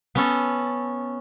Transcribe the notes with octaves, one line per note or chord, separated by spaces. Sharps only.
B3 C#4 A4